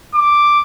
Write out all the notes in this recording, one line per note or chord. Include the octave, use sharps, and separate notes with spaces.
D6